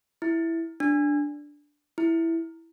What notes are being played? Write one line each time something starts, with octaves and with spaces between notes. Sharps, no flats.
E4
D4
E4